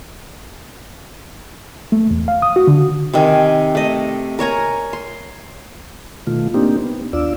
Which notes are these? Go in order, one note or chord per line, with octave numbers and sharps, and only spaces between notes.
A3
E2
F5
D#6
F#4
D3
C3 D#3 G#5
A3 D#5
A#4 C#5 G#5 A#5
C6
B2 D#3 A3 F4
A#3 C4 D4 D#4 G4
B3
D#2 D4 F4 D5 E6